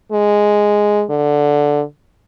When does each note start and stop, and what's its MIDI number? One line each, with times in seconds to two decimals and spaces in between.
0.12 1.04 56
1.10 1.82 50